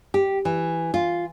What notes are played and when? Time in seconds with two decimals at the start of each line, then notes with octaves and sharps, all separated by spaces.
0.14 G4
0.45 E3
0.94 F4